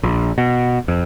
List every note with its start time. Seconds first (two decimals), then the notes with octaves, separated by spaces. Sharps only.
0.03 A#1
0.38 B2
0.88 F2